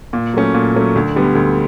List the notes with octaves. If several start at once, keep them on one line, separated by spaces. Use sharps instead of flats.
A#2
F#3 A3 C#4
A#2
F#3 A3 C#4
D2
D3 G3 B3
D2